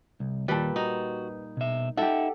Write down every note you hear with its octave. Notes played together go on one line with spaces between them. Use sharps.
C2
D#2 A#2 G3 B4 A5
D#4 F#4
B2 E5
D#4 G4 A4 E5 F#5